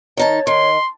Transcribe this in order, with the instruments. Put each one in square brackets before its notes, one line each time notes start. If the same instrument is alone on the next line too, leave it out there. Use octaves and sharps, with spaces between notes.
[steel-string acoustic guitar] D#3 D#4 A5 [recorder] C#5
[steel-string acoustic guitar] D#3 [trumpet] C6